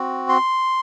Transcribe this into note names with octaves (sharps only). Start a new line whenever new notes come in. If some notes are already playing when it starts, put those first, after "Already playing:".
Already playing: C4 F#4
C6